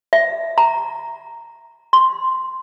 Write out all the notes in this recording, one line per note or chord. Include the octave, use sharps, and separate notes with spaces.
E5
A#5
C6